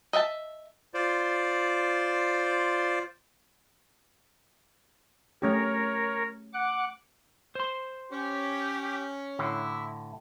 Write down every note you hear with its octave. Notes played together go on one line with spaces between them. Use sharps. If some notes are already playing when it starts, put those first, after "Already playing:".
D#5 E5 F#5 A5
F4 C5 D5
A3 C#4 G4 A#4 C#5
F#5 D6 F#6
C5 C6
C#4 G4
A2 D3 E4